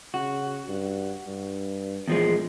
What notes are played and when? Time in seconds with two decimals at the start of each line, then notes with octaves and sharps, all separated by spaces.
0.14 C#3 F#4
0.69 G2
1.28 G2
2.08 A#1 E2 F3 G#3